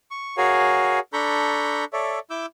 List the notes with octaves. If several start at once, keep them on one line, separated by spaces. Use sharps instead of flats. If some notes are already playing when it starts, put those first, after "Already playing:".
C#6
F#4 G#4 A#4 C#5 F5 G#5
D4 A4 A#5 B5 C#6 G6
A4 C#5 D5 E5
E4 D6 E6 G6